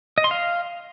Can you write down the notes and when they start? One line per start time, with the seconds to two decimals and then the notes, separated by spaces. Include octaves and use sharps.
0.18 D#5
0.24 C6
0.31 F5